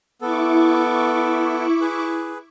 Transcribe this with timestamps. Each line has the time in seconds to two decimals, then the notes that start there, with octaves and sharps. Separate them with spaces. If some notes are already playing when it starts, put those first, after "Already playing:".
0.21 B3 E4 A4 C#6 D6
1.81 G#4 B4